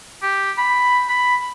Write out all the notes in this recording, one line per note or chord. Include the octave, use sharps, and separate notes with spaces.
G4
B5
B5